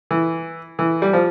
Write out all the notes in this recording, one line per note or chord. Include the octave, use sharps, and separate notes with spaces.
E3
E3
G3
F3